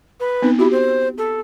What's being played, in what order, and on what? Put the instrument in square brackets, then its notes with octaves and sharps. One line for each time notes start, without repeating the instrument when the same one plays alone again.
[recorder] B4
[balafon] B3 C4 D#4
[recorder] E4 [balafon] F#4 G4
[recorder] C5
A4